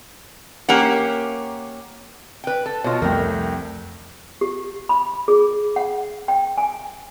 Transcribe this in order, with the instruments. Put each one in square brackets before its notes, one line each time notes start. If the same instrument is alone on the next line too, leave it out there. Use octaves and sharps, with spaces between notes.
[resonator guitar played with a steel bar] A#3 C#4 G4 F#5
B4 G5
A4
[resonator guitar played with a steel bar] B2 F4 [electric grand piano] C#5 D#5
[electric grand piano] C2 A3 G5 [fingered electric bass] F2 [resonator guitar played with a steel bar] A#4
[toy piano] G4
B5
G#4
F#5
G5
G#5